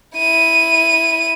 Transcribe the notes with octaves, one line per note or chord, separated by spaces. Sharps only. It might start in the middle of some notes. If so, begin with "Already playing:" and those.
E4 D#7